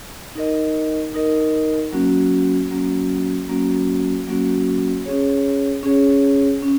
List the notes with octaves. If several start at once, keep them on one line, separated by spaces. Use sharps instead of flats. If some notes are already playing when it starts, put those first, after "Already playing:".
D#4 A#4 D#5
D#4 A#4 D#5
F#3 A#3 C#4 F#4
F#3 A#3 C#4 F#4
F#3 A#3 C#4 F#4
F#3 A#3 C#4 F#4
C#4 G#4 C#5
C#4 G#4 C#5
C#4